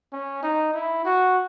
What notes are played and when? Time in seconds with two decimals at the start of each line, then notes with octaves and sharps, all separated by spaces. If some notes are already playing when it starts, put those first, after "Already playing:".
0.13 C#4
0.43 D#4
0.74 E4
1.05 F#4